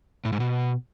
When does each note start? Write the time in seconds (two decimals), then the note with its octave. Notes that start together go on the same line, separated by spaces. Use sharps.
0.25 A2
0.32 G#2
0.40 B2